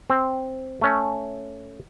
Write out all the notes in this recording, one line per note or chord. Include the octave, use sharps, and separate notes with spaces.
C4
A3 C#4